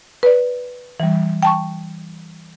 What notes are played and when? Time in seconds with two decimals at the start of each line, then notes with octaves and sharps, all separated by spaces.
0.23 B4 D5
1.00 E3 G3
1.43 G5 A5 C#6